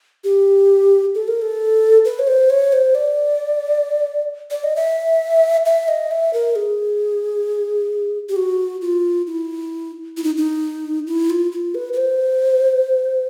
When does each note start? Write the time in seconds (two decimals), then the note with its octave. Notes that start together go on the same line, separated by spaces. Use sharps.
0.24 G4
1.15 A4
1.28 A#4
1.42 A4
2.05 B4
2.19 C#5
2.27 C5
2.50 C#5
2.73 C5
2.95 D5
4.51 D5
4.64 D#5
4.76 E5
5.66 E5
5.88 D#5
6.11 E5
6.34 A#4
6.56 G#4
8.29 G4
8.36 F#4
8.81 F4
9.27 E4
10.17 E4
10.24 D#4
10.37 D#4
11.07 E4
11.30 F4
11.52 F4
11.75 B4
11.93 B4
11.97 C5